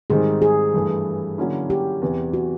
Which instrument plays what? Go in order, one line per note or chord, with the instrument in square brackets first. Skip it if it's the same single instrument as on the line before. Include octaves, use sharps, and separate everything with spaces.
[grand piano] G#2 D#3 G3 C4 D#4 [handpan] G#4
[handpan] G#4
[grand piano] G2 E3 A3
D3 F#3 A#3 C#4 E4
[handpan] G4
[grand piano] E2 C3 E3
[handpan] F#4